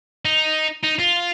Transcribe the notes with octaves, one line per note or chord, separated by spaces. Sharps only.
D#4
D#4
F4